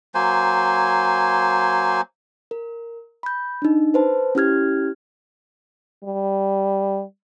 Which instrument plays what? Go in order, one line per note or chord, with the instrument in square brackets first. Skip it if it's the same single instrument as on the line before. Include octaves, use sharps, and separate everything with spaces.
[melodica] F#3 A#3 C5 G#5
[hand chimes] A#4
B5 G6
D4 D#4
B4 C5 A5
C#4 E4 G4 F6 G#6
[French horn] G3